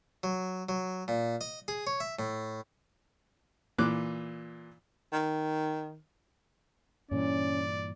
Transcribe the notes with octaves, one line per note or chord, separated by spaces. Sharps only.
F#3
F#3
A#2
D#5
G#4
C#5
E5
A2
A#2 E3 D6 F#6
D#3
G2 A#2 E3 C#4 D5